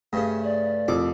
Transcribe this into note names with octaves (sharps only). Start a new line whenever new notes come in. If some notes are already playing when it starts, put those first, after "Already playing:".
G2 C#3 A3
D5
C2 F2 D6